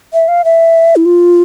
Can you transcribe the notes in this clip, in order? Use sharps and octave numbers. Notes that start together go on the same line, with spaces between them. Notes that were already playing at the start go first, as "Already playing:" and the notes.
E5
F5
E5
E4
F4